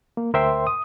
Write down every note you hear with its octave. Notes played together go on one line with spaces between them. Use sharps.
A#3
D2 A#4 C5 E5 G5 C6
D#6